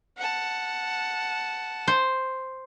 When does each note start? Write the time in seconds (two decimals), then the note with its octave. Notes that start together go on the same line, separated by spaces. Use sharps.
0.18 F#5 A5
1.87 C5